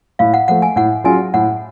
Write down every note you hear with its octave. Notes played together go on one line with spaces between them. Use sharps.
A2 F5
F#5
F3 A3 F#5
G#5
A2 F#5
F#3 C#4 F4 G#4 G#5
A2 F#5